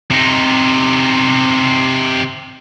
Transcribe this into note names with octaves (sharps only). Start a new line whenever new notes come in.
C3 D#4